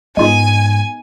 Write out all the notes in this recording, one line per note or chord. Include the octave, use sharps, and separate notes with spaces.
G#2 G#3 B3 D#4 F4 G#4 G#5